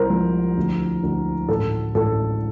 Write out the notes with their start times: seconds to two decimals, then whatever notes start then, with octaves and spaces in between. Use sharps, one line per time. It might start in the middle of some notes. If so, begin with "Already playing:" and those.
Already playing: C2 A#4 C5
0.10 F3
0.57 D2
1.03 D2
1.49 A1 A4
1.95 A1 A4